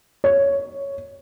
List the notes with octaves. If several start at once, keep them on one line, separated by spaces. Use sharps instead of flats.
C#5